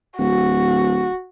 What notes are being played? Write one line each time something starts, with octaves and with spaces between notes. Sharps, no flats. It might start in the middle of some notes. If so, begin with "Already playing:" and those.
D1 F#4